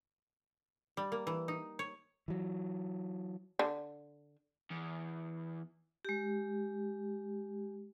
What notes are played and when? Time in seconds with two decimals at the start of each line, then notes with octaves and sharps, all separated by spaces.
0.97 G3
1.12 A#3
1.27 E3
1.48 D#4
1.79 C#5
2.28 E3 F#3
3.59 D3
4.71 E2
6.05 G#3 G4